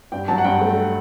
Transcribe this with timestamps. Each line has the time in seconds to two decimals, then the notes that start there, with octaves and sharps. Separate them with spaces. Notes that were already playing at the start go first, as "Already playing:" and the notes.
0.12 G2 G5
0.28 F#3 A5
0.38 F#5
0.44 G2 G5
0.61 A3